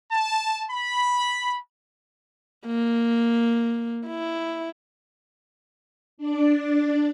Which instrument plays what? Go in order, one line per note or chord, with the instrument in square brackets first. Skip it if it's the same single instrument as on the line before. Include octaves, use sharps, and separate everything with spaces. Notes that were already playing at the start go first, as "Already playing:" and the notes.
[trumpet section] A5
B5
[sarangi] A#3
E4
[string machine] D4 D5